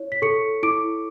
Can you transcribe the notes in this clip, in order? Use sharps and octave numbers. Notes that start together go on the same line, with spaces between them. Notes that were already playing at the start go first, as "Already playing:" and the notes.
Already playing: E4 C#5
B6
A4 C#6 C#7
E4 D6 D7